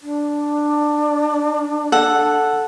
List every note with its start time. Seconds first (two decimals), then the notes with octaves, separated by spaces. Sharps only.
0.01 D4
1.92 A4 F#5